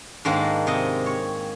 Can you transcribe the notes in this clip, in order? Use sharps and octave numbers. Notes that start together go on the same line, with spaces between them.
G#2 D#3 G#3 A#3 D4
C3 D#5
C#5